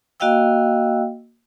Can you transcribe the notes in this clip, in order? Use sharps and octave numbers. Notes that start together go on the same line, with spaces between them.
A#3 F#4 D#5 F5 G5 E6